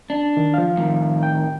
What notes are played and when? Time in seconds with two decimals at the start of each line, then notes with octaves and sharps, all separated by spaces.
0.10 D4
0.37 D#3
0.54 F3 F5
0.77 A2 D#3
1.23 G5